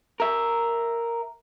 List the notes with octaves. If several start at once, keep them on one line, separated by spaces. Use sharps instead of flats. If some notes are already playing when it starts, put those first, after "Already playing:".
A#4 E5